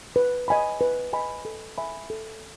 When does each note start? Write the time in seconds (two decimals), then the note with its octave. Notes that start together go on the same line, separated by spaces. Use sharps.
0.16 B4
0.48 D#5 G#5 B5
0.81 B4
1.13 D#5 G#5 B5
1.45 A4
1.78 E5 G#5 B5
2.10 A4